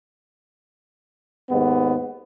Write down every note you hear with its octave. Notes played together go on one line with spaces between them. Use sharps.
D#2 G#2 B3